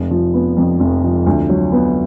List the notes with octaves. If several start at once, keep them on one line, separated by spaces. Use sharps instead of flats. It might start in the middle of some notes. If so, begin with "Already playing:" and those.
Already playing: F1
F3
B3
F2
F1
F3
D2
F#3
B3